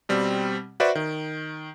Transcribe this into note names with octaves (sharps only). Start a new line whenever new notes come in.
B2 G3 C4
F#4 B4 C5 D5 E5
D#3